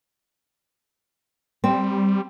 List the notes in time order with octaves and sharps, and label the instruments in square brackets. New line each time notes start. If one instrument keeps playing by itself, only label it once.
[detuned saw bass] G3 [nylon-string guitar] C4